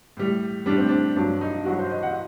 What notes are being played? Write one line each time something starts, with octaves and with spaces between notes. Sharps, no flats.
A2 G3
A2 G3 D4
C4
D4
G2 F#3 D4
D#4
G2 F#3 F#4
C5
D#5
F#5